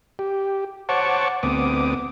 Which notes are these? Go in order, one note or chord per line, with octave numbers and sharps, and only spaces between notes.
G4
C5 C#5 F#5 A5 C#6 D6
D2 B3 C4 D6 D#6